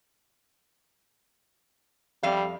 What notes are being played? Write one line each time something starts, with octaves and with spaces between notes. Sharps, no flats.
F2 G3 F5